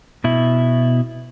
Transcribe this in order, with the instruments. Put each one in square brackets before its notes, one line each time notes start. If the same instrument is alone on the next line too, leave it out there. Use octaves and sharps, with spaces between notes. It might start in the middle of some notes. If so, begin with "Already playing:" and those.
[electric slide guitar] B2 E4